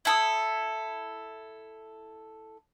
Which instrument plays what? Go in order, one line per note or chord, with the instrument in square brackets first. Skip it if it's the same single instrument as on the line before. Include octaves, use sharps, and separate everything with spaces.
[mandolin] E4 A4 D#6